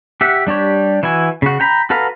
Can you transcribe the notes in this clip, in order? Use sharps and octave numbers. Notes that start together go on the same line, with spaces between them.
G4 E5 F#5
G3 D4 G4 C#5
E3 E4 F#4 G#5
C#3 F#4
G5 A#5 B5
F#4 A4 B4 F5 A#5